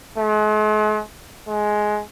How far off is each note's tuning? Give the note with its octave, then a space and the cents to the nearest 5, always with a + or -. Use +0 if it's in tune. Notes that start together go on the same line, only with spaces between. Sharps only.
G#3 +45
G#3 +15